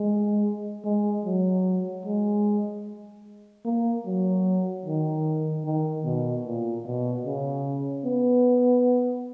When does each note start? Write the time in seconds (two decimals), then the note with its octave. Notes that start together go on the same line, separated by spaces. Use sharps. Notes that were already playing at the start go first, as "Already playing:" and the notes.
Already playing: G#3
0.84 G#3
1.25 F#3
2.05 G#3
3.65 A#3
4.06 F#3
4.86 D#3
5.65 D#3
6.05 B2
6.45 A#2
6.85 B2
7.26 C#3
8.05 B3